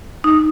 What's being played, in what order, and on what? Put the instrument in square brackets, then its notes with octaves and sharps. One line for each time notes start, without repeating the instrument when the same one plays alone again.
[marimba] D#4